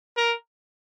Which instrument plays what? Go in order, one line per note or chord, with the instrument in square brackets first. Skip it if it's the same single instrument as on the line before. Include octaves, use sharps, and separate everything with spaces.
[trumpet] A#4